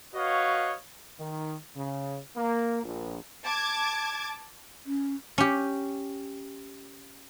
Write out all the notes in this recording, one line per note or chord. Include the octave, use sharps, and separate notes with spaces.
F#4 B4 C#5 D#5 F5
D#3
C#3
A#3
A#1
A5 D6 G#6
C#4
C#4 G4